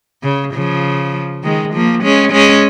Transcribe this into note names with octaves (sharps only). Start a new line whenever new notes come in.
C#3
C#3 F3
D#3 G#3
F3 A#3
G#3 C#4
G#3 C#4